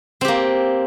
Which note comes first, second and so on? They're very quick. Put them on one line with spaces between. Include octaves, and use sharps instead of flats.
C4 G4 A#3